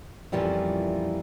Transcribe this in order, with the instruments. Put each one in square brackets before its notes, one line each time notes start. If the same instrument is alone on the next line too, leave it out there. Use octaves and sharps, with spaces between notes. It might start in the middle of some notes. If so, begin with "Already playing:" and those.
[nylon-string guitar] F2 A#2 E3 G3 C#4 E4